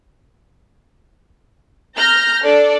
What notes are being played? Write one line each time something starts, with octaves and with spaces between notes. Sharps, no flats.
A#5 F6 G6 A#6
D4 A4 D5